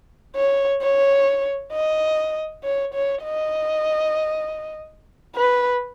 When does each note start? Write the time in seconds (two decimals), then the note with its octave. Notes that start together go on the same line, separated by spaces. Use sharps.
0.36 C#5
0.82 C#5
1.72 D#5
2.64 C#5
2.94 C#5
3.24 D#5
5.35 B4